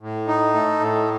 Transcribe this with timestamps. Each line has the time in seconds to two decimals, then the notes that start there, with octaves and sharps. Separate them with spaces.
0.01 A2
0.27 D#4
0.54 A3
0.80 A2